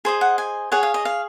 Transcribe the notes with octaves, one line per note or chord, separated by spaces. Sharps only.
G#4 C5 D#5
F#5
G#5
G#4 C#5 F#5
F5
D#5
F5